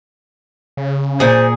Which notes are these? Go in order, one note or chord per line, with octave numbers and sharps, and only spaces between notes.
C#3
A#2 G#4 C5